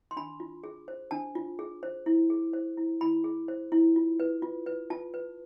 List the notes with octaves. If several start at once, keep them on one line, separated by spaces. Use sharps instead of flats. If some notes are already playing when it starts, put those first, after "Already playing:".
C6
D4 B5
F4
G#4
C5
D4 A5
F4
G#4
C5
E4
G#4
C5
E4
E4 B5
G#4
C5
E4
F4
B4
F4
B4
F4 A5
B4